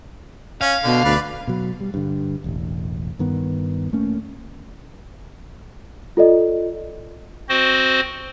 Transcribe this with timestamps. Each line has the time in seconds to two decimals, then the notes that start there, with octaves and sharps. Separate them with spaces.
0.61 C#4 F5
0.84 B2 D3
1.04 D2 B4 D5
1.47 B2 F#3
1.81 G3
1.94 G2 D3
2.44 E1 A1
3.19 G2 D#3 B3
3.92 E1 A3 A#3 C#4
6.17 F4 A4 D5 D#5
7.49 C4 F#4 C5 D#5